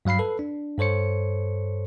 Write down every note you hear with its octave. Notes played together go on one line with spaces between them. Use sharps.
G2 F#3 F5 B5 C7
A4 B4
D4
G2 A4 C5 C#5 C#7